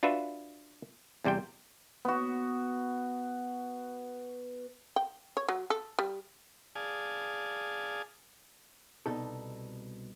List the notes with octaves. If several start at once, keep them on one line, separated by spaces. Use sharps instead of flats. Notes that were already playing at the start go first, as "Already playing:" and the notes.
D4 F4 F#4 B4 E5
E2 C3 G3 C5 G5
B3 F#4
G5
C#5
F#3
A4
G3
G#4 D5 F5 G#5 A5 D#6
C2 B2 D#4 A4